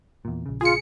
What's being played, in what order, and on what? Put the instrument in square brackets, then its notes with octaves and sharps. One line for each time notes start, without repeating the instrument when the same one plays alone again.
[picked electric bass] E2 A#2
A#1 C#3
[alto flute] F4 [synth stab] G#4 C#7